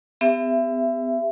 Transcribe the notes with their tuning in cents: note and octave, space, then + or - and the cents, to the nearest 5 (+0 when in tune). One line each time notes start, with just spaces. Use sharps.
B3 +40 G4 +40 E5 +20